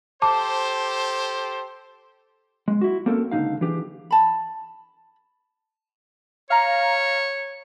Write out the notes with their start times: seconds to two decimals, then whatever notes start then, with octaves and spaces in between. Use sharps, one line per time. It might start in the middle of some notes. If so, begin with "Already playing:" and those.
0.22 G4 A4 C5 A5 D6
2.68 G#3
2.81 E4 F#4
3.06 A#3 C4 C#4 A4 A#4
3.31 C#2 D3 D#3 D#4 F5
3.61 E3 D4 G4 G#4
4.11 A5 B5
6.50 C#5 F5 A#5